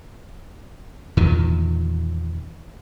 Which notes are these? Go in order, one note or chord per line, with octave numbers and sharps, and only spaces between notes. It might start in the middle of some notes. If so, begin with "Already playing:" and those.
E2 A#2 D#3